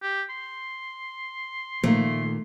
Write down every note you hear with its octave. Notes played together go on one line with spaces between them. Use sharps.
G4
C6
A#2 D#3 F3 A3 A#3